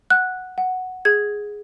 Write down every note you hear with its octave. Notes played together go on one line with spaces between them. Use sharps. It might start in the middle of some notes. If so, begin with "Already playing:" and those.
F#5 F#6
F#5
G#4 G#6